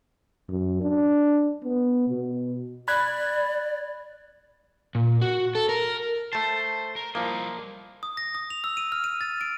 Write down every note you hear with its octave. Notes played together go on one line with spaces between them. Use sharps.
F#2
D4
B3
B2
D5 B5 F#6 G#6
A#2
F#4
A4
A#4
A3 C5 A5
A#4
F3 G3 A#3 E4 D#5
D#6
A#6
D#6
F7
E6
D#7
F6
D#7
A6
D7